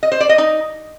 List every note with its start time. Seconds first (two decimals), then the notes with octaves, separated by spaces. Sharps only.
0.03 D#5
0.12 C5
0.20 D5
0.29 D#5
0.38 D#4